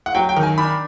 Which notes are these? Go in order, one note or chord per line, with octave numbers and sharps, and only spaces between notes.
F#5
F#3 G5
G5
D#3
G#5
D4 B5